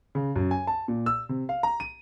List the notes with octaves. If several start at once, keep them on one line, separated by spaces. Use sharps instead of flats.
C#3
F#2
G#5
A5
A#2
E6
C3
F5
A#5
D#7